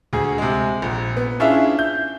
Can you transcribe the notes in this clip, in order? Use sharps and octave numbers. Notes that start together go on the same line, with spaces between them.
D2 G#4
C3 G#3
A#1
B3
C#4 D4 E4 F4 G#4 E5
G6